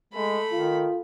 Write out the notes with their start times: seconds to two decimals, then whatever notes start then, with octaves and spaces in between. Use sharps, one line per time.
0.13 G#3 A3 B5
0.52 D#3 F4